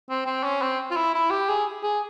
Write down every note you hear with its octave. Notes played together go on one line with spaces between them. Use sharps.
C4
C4
C#4
C4
F4
E4
E4
G4
G#4
G#4